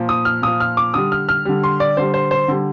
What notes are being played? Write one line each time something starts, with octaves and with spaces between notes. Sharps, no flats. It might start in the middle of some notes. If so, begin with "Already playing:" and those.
Already playing: A#2 F3
D#6
F6
A#2 F3 D#6
F6
D6
D3 G3 D#6
F6
F6
D3 G3
C6
D5
D3 G3 C5
C5
C5
D3 G3